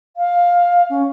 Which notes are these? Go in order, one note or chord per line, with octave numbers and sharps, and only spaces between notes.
F5
C#4